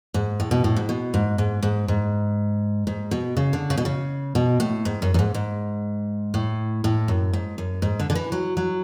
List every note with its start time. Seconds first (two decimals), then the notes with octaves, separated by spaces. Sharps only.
0.14 G#2
0.40 A2
0.51 B2
0.64 A2
0.77 G#2
0.89 B2
1.14 G#2
1.38 G#2
1.63 G#2
1.88 G#2
2.87 G#2
3.11 B2
3.37 C#3
3.53 D3
3.70 C#3
3.77 B2
3.85 C#3
4.35 B2
4.60 A2
4.85 G#2
5.02 F#2
5.14 F#2
5.19 G#2
5.34 G#2
6.34 A2
6.84 A2
7.08 F#2
7.33 G#2
7.58 F#2
7.82 G#2
8.00 D3
8.10 D3
8.15 E3
8.32 F#3
8.57 F#3